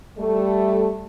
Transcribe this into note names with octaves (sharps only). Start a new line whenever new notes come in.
G3 A3